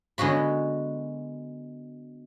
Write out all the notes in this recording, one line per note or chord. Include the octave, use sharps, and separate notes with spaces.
D3 G#3 B3 F#4 B5